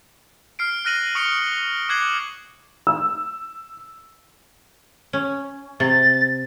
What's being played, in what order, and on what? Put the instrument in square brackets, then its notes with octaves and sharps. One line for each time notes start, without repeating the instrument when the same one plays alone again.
[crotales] F6 C7 D7
F6 F#6 A#6 D#7 F#7
C#6 D#6 C#7 D7 F#7 G7
D6 F#6 G#6 C7 F#7
[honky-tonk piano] E6
[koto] C#4
[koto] C3 [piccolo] A6